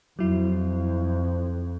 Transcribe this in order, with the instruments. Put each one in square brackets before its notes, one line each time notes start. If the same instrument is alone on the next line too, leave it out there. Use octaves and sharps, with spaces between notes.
[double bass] F2 [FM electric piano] F#3 E4